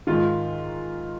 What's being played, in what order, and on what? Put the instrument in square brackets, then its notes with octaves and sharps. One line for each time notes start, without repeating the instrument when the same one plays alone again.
[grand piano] G#2 D#3 F4